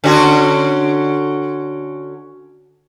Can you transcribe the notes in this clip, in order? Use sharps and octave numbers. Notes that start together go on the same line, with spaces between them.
D3 C#4 F#4